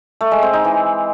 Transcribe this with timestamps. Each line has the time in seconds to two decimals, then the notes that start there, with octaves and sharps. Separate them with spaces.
0.21 A3
0.32 G#3
0.43 C4
0.53 D#4
0.64 E3